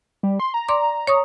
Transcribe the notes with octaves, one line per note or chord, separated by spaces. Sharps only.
G3
C6
A#5
D5 C6 D6
C#5 C#6 D#6